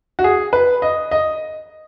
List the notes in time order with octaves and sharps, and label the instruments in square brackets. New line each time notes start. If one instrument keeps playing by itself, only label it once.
[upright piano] F#4
G#4
B4
D#5
D#5